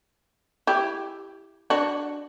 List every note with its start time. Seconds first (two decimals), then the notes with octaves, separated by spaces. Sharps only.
0.67 E4 G4
1.70 D4 F#4